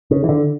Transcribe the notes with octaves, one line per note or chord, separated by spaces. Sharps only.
C#3
E3
D3